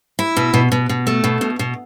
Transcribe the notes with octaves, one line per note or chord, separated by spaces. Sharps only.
E4
B2
B2
B2
B2
A3
B2
B2
B2